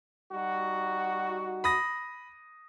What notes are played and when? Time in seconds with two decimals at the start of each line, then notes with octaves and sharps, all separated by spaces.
0.32 G3 D#4 F#4
1.64 B5 D#6 A#6